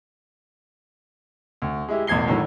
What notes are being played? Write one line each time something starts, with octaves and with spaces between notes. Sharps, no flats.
D2
G#3 E4 G4
E1 A1 E2 G#6 C7 G7
A2 D3 D#3 F#3